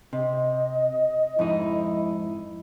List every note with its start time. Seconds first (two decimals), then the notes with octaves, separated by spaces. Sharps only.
0.13 C3 D#5
1.39 F2 G#2 D#4 E4